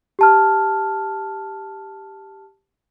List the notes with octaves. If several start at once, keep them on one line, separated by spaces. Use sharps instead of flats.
G4 A5 F6